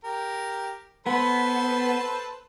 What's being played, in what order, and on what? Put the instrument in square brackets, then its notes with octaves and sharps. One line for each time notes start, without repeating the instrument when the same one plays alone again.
[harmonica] G4 A#4
[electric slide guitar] B3 [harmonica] A4 B4 C5